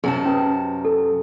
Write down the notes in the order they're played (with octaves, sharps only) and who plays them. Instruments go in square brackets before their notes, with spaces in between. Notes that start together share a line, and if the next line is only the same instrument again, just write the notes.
[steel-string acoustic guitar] F#2 C3 A5 [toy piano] G#4
[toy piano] C#4 B4 D#6
A4